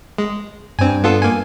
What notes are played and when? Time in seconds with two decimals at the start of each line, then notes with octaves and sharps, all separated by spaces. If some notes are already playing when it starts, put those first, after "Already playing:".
0.18 G#3
0.79 G2 C4 G#5
1.04 B3 F4 A4
1.22 A#3 G#5